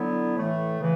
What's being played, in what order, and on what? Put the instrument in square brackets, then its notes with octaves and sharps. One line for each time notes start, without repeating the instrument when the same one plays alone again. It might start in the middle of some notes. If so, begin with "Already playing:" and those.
Already playing: [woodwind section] D3 F#3 B3 E4
A2 E3 A3
C#3 E3